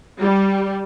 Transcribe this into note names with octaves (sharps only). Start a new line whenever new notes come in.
G3